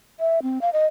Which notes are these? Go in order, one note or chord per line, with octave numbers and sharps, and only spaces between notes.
E5
C4
F5
D#5